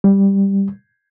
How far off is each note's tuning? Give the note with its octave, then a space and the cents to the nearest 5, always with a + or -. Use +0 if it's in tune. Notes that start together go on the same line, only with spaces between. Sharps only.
G3 +5